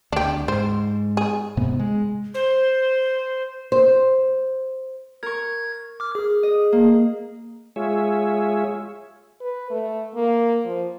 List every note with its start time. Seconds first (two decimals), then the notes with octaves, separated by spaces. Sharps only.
0.12 D2 D4 G4
0.48 G#2 C5
1.17 G#4
1.57 G#2 C3 B3
1.79 G#3
2.34 C5
3.72 C5
5.23 A#4 C#6 G#6
6.00 D6 F6
6.15 G#4
6.43 D#5
6.72 A#3
7.76 G#3 F4 G#4 C#5 E5
9.41 B4
9.70 A3
10.15 A#3
10.65 F3